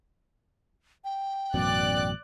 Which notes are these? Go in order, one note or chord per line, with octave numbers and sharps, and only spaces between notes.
G5
A1 F#2 B2 D5 F#6